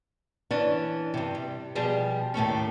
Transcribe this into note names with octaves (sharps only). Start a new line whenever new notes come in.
E3 C#4 D4
G2 C3
G3
B2 F3 G3 G4 G#4
D#2 A2 A3 C#4